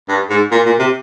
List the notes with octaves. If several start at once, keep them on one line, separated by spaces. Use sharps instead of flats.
G2
G#2
A#2
A#2
C3